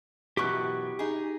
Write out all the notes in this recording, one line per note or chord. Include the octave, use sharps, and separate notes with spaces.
F#2 B2 E3 G4 C#6 F#6
D#4 G#4